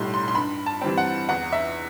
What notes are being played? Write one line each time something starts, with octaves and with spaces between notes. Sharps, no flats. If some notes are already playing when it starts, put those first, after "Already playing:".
Already playing: B1 A2 G3 B5 C6
C6
C6
G2 B5
A5
E3 G3 C4
F#5
E2 F#5
E5